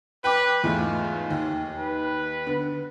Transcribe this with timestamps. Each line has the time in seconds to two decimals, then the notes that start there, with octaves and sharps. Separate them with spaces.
0.24 B4 G5 D6
0.64 E2 G#2 A3 F4
1.30 D#2
1.79 B4
2.47 D3 B3